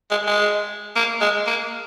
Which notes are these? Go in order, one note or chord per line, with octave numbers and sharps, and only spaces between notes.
G#3
G#3
A#3
G#3
A#3